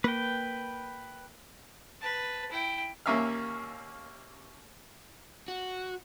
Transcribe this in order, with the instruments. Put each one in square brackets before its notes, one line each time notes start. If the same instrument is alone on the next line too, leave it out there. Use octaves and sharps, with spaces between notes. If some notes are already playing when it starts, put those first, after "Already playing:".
[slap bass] A#3 [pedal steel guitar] B4 G5
[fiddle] B4 A5
E4 G5
[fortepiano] D#2 A#3 C#4 E5 F5 F6
[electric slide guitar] F#4